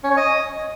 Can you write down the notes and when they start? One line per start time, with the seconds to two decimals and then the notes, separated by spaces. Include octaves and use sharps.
0.04 C#4
0.11 C#5
0.17 D#5